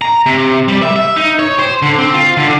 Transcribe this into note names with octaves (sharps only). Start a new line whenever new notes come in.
A#5
C3
G3
E5
E5
D#4
C#5
C5
D3
C4
F4
D3